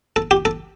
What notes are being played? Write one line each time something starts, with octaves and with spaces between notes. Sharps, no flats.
A4
G4
A4